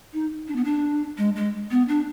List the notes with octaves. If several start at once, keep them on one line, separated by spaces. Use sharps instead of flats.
D#4
D4
B3
D4
G#3
G#3
B3
D4